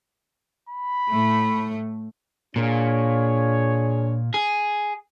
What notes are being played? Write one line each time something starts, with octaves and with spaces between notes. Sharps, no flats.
B5
A2 A3
A#2 D4 G#4 C#5
G#4